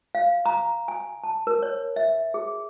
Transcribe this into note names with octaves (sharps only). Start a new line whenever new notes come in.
F5
A#5
G#5
A5
A#4
C#5
E5
G#4